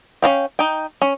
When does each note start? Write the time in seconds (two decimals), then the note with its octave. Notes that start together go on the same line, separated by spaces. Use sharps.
0.22 C#4 F#4 F5 G5
0.59 D#4 G5
1.02 C#4